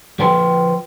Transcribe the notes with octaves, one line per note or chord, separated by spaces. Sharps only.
F3 B4 G5 C6